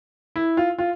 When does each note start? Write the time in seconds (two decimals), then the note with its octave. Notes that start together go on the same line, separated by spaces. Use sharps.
0.36 E4
0.57 F4
0.78 F4